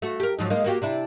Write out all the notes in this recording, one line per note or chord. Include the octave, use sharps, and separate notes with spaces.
A3 F#4
G4 A#4
G#2 F3 F#3
G#3 A#3 D#4
A#3 F#4 G4
C3 D4 E4